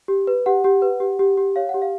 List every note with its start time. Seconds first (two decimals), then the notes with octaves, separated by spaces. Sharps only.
0.08 G4
0.27 B4
0.46 G4 F#5
0.64 G4
0.82 B4
1.00 G4
1.19 G4
1.37 G4
1.56 C#5 F5
1.69 F#5
1.74 G4
1.82 F5